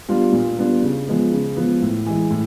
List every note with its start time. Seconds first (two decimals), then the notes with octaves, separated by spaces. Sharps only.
0.08 G3 B3 D4 F4
0.32 A#2
0.58 G3 B3 D4 F4
0.82 C#3
1.07 F3 G#3 B3
1.32 C#3
1.56 F3 G#3 B3
1.82 A2
2.06 E3 G#3
2.31 A2